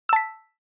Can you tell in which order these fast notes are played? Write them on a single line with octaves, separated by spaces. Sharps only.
E6 A5 B6